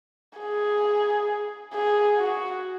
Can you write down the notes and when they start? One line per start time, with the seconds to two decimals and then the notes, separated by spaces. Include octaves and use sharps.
0.39 G#4
1.73 G#4
2.18 F#4